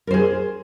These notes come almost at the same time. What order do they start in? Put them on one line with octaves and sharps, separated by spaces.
A#4 C5 G#4